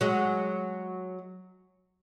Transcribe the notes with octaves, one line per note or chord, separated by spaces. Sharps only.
F#3 G#3